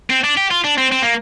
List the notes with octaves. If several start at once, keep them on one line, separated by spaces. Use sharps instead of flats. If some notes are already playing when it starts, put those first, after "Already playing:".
C4
D4
G4
F4
D4
C4
C4
A#3